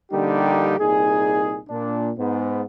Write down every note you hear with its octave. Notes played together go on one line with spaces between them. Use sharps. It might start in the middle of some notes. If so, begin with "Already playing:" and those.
A#1 D3 G3 A#3 D#4 G4
C2 A#2 D#4 G#4
A#2 D4
G#2 B3